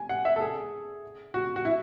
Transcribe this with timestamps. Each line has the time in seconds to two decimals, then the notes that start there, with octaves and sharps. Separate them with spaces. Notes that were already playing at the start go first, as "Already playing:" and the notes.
Already playing: G#5
0.09 F#5
0.25 E5
0.36 A4
0.40 G#4
1.34 F#4
1.56 F#4
1.65 E4